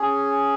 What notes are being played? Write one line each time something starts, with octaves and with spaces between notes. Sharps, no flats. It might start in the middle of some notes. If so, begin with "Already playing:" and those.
Already playing: C#4 G#4